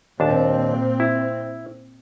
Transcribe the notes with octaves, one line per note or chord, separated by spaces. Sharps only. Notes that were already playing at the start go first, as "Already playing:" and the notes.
D#2 A#2 C4 D4 A5
E4